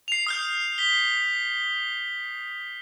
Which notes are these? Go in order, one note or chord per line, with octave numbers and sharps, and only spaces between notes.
C7 F7
D#6 F6 G6
B6 G7